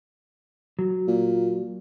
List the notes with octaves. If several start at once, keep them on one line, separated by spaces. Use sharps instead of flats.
F#3
A#2